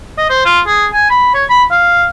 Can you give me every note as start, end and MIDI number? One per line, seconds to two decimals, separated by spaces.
0.17 0.29 75
0.29 0.45 72
0.45 0.60 65
0.67 0.86 68
0.93 1.07 80
1.10 1.29 83
1.34 1.44 73
1.49 1.63 83
1.71 2.08 77